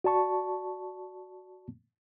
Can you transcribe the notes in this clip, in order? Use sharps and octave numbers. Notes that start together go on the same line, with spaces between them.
F#4 D5 A5 C#6